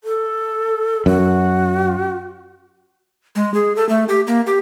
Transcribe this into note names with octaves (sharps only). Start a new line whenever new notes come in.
A4
F#2 F#4
G#3
G#4
A4
A3
G4
A#3
G4